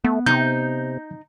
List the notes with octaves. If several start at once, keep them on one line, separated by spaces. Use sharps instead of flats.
A3 B3
C3 D#4 G6